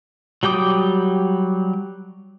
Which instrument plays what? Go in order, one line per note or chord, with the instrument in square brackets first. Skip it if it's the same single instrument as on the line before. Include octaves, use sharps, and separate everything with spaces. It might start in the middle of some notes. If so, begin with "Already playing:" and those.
[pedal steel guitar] F#3 G3 G5 D6 D#6